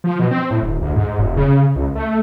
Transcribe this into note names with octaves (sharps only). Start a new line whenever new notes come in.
F3
B2
C4
A2
D1
D2
G#2
F1
C#3
C#2
A3